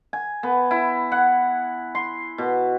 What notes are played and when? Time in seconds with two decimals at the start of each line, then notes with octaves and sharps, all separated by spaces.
0.13 G#5
0.43 B3
0.71 E4
1.12 F#5
1.95 C6
2.38 B2